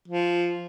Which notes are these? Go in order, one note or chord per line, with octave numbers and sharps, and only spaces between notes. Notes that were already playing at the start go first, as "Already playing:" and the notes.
F3